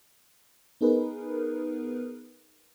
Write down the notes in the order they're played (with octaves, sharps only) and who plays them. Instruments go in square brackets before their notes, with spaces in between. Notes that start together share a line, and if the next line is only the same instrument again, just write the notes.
[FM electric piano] B3 D#4 G#4 A#4 B4